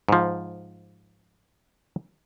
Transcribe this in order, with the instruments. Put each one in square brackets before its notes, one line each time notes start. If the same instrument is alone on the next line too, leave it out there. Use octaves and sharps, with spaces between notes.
[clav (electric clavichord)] G#2 F3